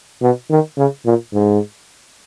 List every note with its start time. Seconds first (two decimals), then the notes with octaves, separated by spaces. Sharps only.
0.22 B2
0.50 D#3
0.77 C#3
1.05 A#2
1.34 G#2